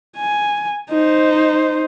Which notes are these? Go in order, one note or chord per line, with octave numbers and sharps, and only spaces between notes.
G#5
D#4 C5